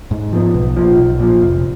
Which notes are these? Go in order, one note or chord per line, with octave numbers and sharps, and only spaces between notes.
G#2
F3 B3
B1
A#2 F3
B1
A#2 F3
F1